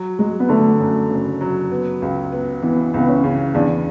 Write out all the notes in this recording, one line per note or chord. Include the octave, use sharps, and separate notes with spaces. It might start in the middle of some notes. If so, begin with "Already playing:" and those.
Already playing: F#3
F#3 G#3
B3
D3 A3
F#2
F#1
F#3
B3
C#2
B3
E3 B3
C#2 B3
C#4
C#3
E2 D4